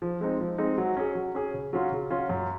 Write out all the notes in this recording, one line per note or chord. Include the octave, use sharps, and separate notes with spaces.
F3
G#3 C4 D#4
F3
G#3 C4 D#4
F#3
C#4 G#4
F#3
C#4 G#4
C#3
F#3 C#4 F4
C#3
F#3 C#4 F4
F#2